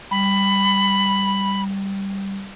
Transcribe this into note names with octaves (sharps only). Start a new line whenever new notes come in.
G3 B5